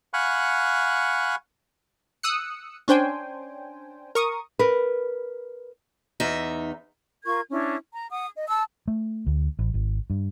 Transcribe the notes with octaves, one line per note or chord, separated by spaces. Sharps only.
F5 F#5 G#5 B5 C#6 F#6
D#6 E6 F#6 C#7
C#4 D4 C5 G5 G#5
A#4 C#6 D#6
A#4 B4
E2 D#4 E5
F4 A#4 C#6 G#6
C#4 D4 E4
A#5
F#5 D#6
D#5
A5 E6
A3
D2
A1
G#1
G2